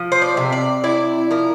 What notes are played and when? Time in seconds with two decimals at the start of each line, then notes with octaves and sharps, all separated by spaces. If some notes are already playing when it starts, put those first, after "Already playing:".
Already playing: F3
0.12 C5
0.22 D5
0.37 C3
0.52 D5
0.84 E4 D5
1.31 F3 A#4